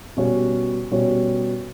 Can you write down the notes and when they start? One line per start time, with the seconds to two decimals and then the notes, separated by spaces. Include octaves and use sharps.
0.17 B2 G3 C#4 F#4 C#5
0.91 B2 G3 C#4 F#4 C#5